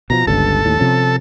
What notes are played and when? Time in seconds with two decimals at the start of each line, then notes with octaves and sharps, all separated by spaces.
0.10 B2 D3 F3 A#5
0.27 G1 C#2 G2 A4
0.65 D#2 A2
0.80 C3 F3 C#4